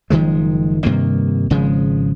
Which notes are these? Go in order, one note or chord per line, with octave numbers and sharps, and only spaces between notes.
F#1 D#3 F3 G#3
G2 C3 D#3 A#3
G#1 C#3 F3 G#3